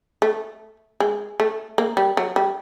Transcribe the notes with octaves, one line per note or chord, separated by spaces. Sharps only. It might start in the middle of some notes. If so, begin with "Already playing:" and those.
A3
G#3
A3
A#3
G3
F#3
G3